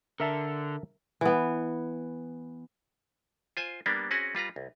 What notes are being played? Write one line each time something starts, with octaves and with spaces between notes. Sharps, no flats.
D3 A#4 E5 A5
E3 B3
F4 C5 G#5
G3 A#3 B3 D4
C4 C#4 F#4 G#4 F#5
G3 F4 B4 A#5
C2